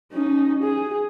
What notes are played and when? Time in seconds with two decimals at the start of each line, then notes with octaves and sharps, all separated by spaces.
0.13 C#4 D#4
0.63 G#4